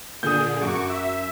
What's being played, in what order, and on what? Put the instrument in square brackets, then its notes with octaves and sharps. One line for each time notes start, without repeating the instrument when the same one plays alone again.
[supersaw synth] A#2 D3 G#4 [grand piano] D#6 G6
[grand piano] F#2 [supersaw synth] F#4 C#6 D6
[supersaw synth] E5